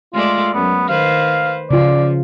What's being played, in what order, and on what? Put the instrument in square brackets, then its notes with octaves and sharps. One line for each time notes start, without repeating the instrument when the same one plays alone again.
[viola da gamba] G#3 A3 D5 [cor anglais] F4
[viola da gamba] F#2 [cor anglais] B3
[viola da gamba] D#3 B4 C5 [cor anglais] F5
[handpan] C#3 F4 [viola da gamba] F3 [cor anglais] D5